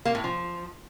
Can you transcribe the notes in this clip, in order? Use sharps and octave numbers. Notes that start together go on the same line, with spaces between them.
A#3
A2
F3